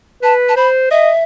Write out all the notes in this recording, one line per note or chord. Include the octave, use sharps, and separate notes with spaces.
B4 A5
A5
C5 B5
D#5 E5